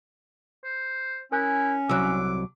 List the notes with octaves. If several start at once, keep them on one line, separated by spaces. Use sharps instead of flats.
C5
C#4 E4 A#4 G#5 F#6
C2 F#3 D6 E6 F#6